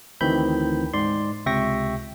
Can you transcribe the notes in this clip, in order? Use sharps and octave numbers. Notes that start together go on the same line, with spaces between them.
D2 D#3 E3 C4 B5 G6
G#2 D5 C6
C#2 C3 E5 G5 C#6 A#6